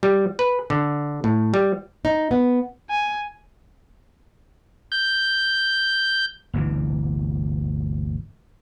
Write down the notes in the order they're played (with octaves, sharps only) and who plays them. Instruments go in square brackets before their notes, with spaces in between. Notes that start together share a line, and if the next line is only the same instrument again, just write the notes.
[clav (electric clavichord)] G3
B4
D3
A2
G3
[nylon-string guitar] D#4
B3
[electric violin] G#5
[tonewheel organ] G6
[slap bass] G1 D2 C3 E3